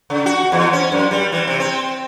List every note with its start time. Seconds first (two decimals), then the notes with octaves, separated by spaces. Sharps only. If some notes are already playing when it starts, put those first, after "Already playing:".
0.10 C#3
0.26 F#4
0.52 E2
0.73 C#4
0.92 F#2
1.11 G3
1.32 E3
1.47 C3
1.60 C4